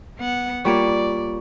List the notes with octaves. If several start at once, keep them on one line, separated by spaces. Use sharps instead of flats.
B3 F#5
G3 A#3 F4 C#5 D5 C#6